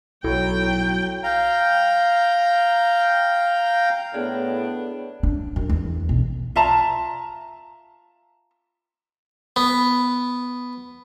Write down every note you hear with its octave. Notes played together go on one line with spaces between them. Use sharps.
B1 F#3 E4 F#4 A4 G5
F5 G5 A#5
A2 B3 D4 G#4
D4
F#2
E2
B1
F4 E5 A5 A#5
B3